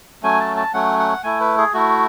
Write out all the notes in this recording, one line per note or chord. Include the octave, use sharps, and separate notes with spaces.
F#3 A3 C#4 G#5
A5
A5
F#3 A3 C#4 F#5
F#5
A3 E4 G#5
B4
G#4
A3 E4 F#4